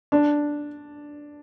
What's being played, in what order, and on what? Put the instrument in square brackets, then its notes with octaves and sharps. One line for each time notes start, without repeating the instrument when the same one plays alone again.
[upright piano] D4